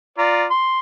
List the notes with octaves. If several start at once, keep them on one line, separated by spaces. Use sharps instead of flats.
F4 D5 A#5
C6